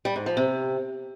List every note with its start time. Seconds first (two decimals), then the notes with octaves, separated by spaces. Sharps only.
0.05 G3
0.16 G#2
0.26 F3
0.37 C3